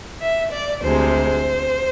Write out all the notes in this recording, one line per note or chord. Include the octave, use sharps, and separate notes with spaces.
E5
D5
D2 C3 G#3 C5